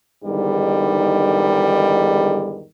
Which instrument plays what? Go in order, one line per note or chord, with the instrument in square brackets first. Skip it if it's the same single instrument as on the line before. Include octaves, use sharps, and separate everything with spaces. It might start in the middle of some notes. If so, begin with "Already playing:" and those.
[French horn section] E2 G#2 D3 D#3 G3